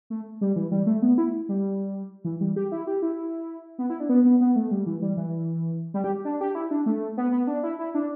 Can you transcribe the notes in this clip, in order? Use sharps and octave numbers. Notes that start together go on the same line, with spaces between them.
A3
G3
E3
G3
A3
B3
E4
G3
E3
G3
G4
E4
G4
E4
B3
E4
D4
B3
B3
B3
A3
G3
E3
G3
E3
G3
G4
D4
G4
E4
D4
A3
B3
B3
D4
E4
E4
D4